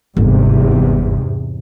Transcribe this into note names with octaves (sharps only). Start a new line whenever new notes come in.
G1 E2 G#2 C3